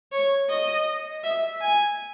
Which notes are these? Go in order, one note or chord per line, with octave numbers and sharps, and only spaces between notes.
C#5
D#5
E5
G#5